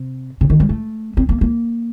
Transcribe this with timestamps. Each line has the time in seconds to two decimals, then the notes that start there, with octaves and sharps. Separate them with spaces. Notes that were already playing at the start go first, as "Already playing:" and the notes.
Already playing: C3
0.41 C3
0.50 D#3
0.60 G3
0.69 A3
1.17 C4
1.29 A#3
1.41 A#3